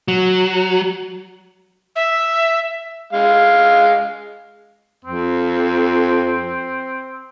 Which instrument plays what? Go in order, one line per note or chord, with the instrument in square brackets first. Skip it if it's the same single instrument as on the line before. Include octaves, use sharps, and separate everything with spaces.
[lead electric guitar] F#3
[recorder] E5
[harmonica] G#3 F5
[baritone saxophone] F2 [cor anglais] C4